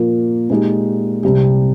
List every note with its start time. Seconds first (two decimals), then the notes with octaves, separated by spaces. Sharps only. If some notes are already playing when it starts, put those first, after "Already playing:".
Already playing: A#2 F3 A#3 F4
0.50 A#2 G#3 D#4 G4
1.23 C2 C3 G3 C4 G4